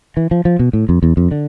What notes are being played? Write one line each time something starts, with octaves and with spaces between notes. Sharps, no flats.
E3
F3
F3
B2
A2
F2
E2
F2
D3